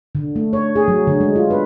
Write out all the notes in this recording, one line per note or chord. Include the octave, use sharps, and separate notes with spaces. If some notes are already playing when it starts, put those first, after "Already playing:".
D3
A3
C#5
G#4
F#3
D3
G#3
F4
B4